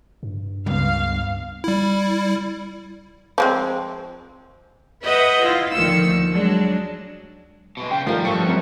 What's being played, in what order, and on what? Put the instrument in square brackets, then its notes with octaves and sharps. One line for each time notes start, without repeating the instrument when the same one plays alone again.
[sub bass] G2
[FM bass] C#2 [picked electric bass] G3 B3 [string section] F5
[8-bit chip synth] G3 E4
[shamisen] F3 G#3 C4
[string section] B4 D#5 E5 F#5 G6
E4 F4
D2 A#2 D#3 F3 E6 C#7
F#3 G#3 D4
[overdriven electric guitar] B2 G#3
[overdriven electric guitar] C#3 [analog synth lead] G5
[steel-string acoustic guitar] D#3 A#4 [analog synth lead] F3 [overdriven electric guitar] G3 [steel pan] A3
[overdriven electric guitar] G2 [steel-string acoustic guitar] F3 A4 [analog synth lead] C#6
[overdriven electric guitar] F#2 [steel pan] G3 C4 A#4